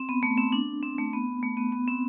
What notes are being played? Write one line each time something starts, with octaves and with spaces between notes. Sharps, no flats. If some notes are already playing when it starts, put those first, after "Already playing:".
Already playing: C4
B3
A3
C4
D4
C4
A3
B3
A3
B3
B3
C4